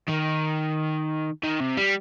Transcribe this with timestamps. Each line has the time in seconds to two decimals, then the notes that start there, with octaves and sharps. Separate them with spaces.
0.09 D#3
1.44 D#3
1.60 C3
1.77 G3